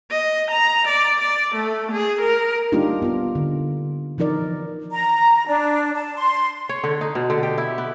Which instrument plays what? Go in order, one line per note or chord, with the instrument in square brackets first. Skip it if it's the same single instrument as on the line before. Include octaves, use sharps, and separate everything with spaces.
[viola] D#5
A#5
D5
D5
A3
G#4
A#4
[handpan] G3 A#3 D4 D#4 F4 G4
B3 F4
D3
E3 F3 D#4 A#4 D5
[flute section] A#5
D4
A5
C6
[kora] C#5
D3
D#4
B2
D3
G4
E4
B3